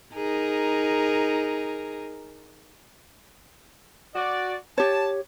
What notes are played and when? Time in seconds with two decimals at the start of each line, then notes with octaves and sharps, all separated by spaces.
0.14 D#4 G#4 A#4
4.15 F#4 D5
4.78 G4 C#5 A5